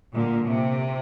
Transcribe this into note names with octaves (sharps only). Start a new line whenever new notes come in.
A#2 D3
C3